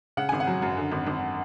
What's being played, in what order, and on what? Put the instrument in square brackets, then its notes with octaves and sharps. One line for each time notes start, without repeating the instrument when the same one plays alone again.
[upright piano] C#3 F#5
G#1 G#5
F#5
F#3
F#2
D3
G#1
G#1